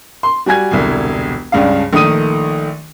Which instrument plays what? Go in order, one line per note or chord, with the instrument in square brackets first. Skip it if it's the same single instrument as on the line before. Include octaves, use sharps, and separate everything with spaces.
[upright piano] C6
G3 F#4 G#5 G#6
E1 C2 D3
C#2 G2 C#3 D4 F5
A#1 D#3 A3 D#6 D#7